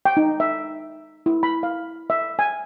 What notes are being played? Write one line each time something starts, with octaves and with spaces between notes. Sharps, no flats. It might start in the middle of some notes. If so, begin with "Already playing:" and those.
G5
D#4
E5
E4
B5
F5
E5
G#5